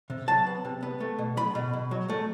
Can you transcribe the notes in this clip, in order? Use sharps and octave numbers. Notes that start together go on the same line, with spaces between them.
C3
F#3 A5
B3
C3
B3
A3
B2
F#3 B5
B2
B2
F#3
A3